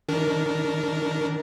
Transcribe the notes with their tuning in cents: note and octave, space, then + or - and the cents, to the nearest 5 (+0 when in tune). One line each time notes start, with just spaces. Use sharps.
D#3 +20 D4 -15 A#4 +0